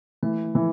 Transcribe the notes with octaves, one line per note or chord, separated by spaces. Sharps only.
E3 A3
E3 F3